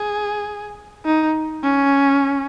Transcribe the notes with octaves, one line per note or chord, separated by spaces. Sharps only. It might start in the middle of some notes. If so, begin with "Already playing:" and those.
Already playing: G#4
D#4
C#4